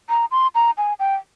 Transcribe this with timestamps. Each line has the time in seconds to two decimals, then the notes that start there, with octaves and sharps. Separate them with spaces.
0.09 A#5
0.31 C6
0.55 A#5
0.78 G#5
0.99 G5